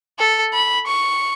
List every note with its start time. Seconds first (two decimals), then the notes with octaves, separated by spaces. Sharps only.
0.19 A4
0.53 B5
0.87 C#6